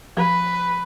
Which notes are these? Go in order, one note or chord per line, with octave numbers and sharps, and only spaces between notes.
F3 B4